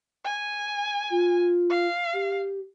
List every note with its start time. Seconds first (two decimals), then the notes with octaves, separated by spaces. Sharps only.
0.25 G#5
1.11 F4
1.70 F5
2.14 G4